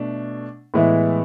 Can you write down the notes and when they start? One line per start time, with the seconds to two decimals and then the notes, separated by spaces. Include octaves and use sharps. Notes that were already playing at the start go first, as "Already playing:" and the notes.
Already playing: B2 A3 D4
0.74 A2 E3 G#3 B3 E4